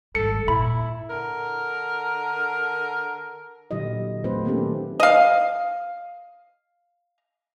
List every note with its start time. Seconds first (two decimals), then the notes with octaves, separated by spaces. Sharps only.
0.15 G#1 G3 A4 C#7
0.48 A#2 E4 B5
1.09 D3 A#4
3.71 A#2 D3 F#3 E4 G4 D#5
4.24 F#3 A3 C4 F4 B4 C5
4.45 D#3 A#3 B3 C#4 G4 A4
5.00 D#5 F5